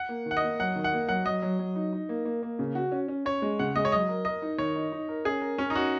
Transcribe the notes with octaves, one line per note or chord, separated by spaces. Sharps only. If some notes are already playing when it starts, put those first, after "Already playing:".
Already playing: F#5
A#3
D#3
F#5
D#5
A#3
F#3 F#5
D#3
F#5
A#3
F#3 F#5
F#3 D#5
F#3
F#3
D#4
D#4
A#3
A#3
A#3
C#3
F#4
C#4
C#4
C#4 C#5
G#3
C#3 F#5
G#3 D#5
C#5
F#3 D#5
A#4
A#4 D#5
D#4
D#3 C#5
D#4
D#4
A#4
C#4 G#4
A#4
C#4 A#4
D#4
C#4 F#4